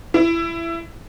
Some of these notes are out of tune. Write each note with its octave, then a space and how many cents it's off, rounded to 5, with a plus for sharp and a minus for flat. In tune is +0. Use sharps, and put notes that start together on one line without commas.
E4 +20